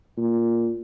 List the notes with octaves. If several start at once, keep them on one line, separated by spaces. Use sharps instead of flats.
A#2